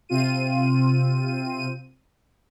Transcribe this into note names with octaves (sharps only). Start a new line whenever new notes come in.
C3 C4 F4 D#7